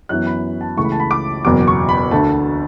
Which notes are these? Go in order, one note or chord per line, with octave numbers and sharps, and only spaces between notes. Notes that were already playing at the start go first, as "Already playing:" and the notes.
F#2 E3 B3 F#6
B5
A5
C#2 C#3 E3 A3 C#6
B5
A5
B5
D6
F#1 E2 B2 D6
C#6
B5
D2 D3 A3 A5